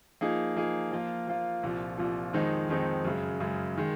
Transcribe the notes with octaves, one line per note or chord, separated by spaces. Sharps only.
F3 A#3 D#4 G#4
F3 A#3 D#4 G#4
F3 A#3 F4
F3 A#3 F4
C2 A#2 F3
C2 A#2 F3
F2 D#3 G#3 C4 D#4
F2 D#3 G#3 C4 D#4
F#2 C#3 G#3
F#2 C#3 G#3
D#3 G#3